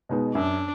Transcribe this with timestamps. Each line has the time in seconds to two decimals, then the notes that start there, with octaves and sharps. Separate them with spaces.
0.09 B2 G#3 B3 D#4
0.35 F#2 D4